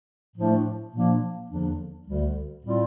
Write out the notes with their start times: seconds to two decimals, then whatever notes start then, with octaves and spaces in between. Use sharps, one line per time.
0.35 A2 F3 A3 D4
0.92 A#2 F3 A#3 D4
1.49 E2 D3 F3 A#3 D4
2.06 D2 D3 G3
2.63 A2 G3 C4 F4